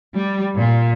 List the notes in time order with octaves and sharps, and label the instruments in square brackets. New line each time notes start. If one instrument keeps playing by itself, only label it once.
[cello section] G3
A#2